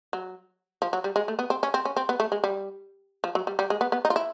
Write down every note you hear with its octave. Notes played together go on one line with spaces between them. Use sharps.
F#3
F3
F#3
G3
G#3
A3
B3
C4
C#4
C4
C#4
C4
B3
A3
G#3
G3
F3
F#3
G3
G3
G#3
B3
B3
D#4
F4
E4